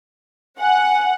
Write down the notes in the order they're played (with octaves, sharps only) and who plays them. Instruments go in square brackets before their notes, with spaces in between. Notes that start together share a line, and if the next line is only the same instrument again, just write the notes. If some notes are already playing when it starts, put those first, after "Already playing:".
[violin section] F#5 [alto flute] G#5